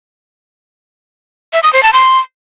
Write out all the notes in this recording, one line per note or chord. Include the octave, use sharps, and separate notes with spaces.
E5
D#6
C5
A5
C6